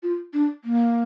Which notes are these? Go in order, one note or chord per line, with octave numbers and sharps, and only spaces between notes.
F4
D4
A#3